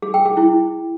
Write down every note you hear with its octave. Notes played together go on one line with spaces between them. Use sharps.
G#4
G5
G#4
E4